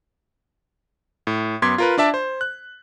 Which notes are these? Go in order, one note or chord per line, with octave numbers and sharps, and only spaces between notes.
A2
F#2 B3 C6 D6 G#6 B6
F4 A#4 B4
D4 D5 E5 A5
C5
F#6